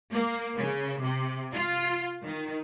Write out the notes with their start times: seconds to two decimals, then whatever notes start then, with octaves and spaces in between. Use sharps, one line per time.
0.12 A#3
0.56 C#3
1.01 C3
1.52 F4
2.24 D#3